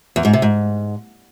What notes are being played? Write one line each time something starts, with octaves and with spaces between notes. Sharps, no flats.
E2
G#2
C3
G#2